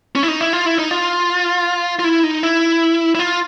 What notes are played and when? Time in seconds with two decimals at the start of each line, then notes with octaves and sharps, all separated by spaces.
0.15 C#4
0.23 E4
0.28 D#4
0.41 E4
0.53 F4
0.66 E4
0.79 D#4
0.91 F4
1.99 F4
2.04 E4
2.23 D#4
2.43 E4
3.15 E4
3.19 F4